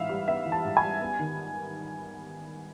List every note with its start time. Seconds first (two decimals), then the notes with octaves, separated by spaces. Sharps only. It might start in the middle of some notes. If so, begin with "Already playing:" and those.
Already playing: G#2 E3 B3 E5 F5
0.09 G3
0.28 B3 E5
0.46 E3
0.52 A5
0.65 G#2
0.77 G#5
0.82 G3
1.01 B3
1.19 D#3